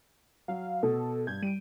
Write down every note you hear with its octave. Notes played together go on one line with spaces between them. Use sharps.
F#3 F5
B2 A4
G2 G6 G#6
G3 D7 D#7